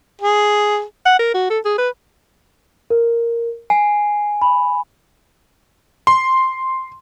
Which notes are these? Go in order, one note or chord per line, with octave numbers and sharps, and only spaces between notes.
G#4
F#5
A#4
F#4
A4
G#4
B4
A#4
G#5 C7
B5
C6